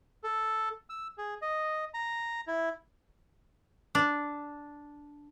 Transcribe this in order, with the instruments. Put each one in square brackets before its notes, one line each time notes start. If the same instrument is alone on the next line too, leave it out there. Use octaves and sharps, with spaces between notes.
[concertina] A4
E6
G#4
D#5
A#5
E4
[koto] D4